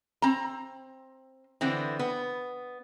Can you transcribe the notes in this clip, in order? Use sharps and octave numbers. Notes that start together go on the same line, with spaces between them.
C4 A#5
D3 E3 B3 C4
B3